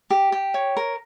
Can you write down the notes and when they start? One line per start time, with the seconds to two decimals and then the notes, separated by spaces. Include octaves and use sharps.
0.10 G4
0.32 G4
0.54 C#5
0.77 A#4